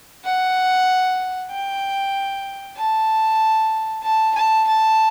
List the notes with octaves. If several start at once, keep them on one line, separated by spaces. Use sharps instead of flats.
F#5
G5
A5
A5
A5
A5